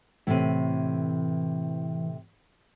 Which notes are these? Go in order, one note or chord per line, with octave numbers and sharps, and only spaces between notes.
A2 C3 E3